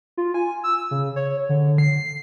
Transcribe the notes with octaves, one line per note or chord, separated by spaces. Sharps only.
F4
G#5
E6
C#3
C#5
D3
C7